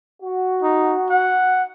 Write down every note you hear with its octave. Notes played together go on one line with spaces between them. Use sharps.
F#4
D#4
F#5